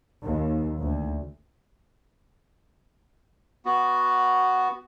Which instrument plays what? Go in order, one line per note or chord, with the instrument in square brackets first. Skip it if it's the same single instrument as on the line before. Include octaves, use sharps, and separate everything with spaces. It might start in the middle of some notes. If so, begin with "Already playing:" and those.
[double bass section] D#2
D2
[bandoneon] B3 F#4